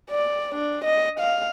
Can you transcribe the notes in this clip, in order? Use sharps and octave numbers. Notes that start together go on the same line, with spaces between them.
D5
D4
D#5
F5